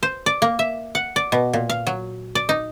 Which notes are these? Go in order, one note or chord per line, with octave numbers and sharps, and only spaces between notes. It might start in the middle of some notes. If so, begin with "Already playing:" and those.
C5
D5
A#3
E5
F#5
D5
B2
A#2
F5
F#3
D5
D#4